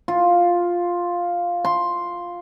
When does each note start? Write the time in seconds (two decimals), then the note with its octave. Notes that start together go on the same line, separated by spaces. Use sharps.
0.08 F4
1.65 C6